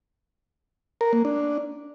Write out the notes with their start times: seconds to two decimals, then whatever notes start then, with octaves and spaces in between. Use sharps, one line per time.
1.01 A#4
1.13 A#3
1.25 D4